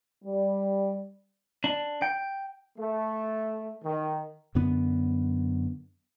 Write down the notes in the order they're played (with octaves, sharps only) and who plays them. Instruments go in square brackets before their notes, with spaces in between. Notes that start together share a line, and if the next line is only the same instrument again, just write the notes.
[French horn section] G3
[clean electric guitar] D4
G5
[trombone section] A3
D#3
[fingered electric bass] F#2 D3 B3